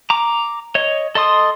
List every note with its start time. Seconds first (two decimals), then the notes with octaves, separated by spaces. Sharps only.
0.10 A#5 D6
0.75 C#5 D#5
1.15 A4 D#5 C6 D#6